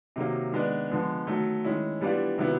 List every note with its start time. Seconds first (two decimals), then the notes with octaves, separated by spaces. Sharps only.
0.16 C3 D#3 F#3 A#3
0.52 D#3 G#3 B3 D4
0.90 D3 F3 G#3 B3
1.27 D#3 F#3 A3
1.64 D#3 G#3 C#4 E4
2.01 E3 G3 B3 D4 F4
2.38 C3 D#3 F#3 B3 E4